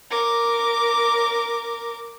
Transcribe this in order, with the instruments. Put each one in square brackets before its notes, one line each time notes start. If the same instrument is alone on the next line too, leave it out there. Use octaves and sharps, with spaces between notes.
[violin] A#4 D6